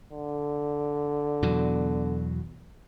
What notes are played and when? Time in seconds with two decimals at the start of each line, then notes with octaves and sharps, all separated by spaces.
0.13 D3
1.42 E2 B2 F#3